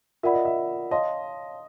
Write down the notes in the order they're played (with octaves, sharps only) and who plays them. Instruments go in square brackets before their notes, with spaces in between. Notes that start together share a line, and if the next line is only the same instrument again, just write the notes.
[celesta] F4 A#4 D5 F#5 B5 [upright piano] E5
[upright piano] D#5
E5
[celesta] C#5 F5 A5 C6 [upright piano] D#5